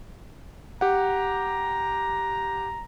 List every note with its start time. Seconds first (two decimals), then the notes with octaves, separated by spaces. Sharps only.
0.81 G4 F#5 A#5